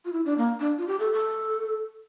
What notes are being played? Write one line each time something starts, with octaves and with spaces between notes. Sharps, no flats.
F4
E4
D4
A#3
D4
F4
G4
A4
A4